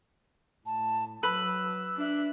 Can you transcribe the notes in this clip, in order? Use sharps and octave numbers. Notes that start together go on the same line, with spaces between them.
A2 A5
F#3 B4 E6
D4 E5 F#6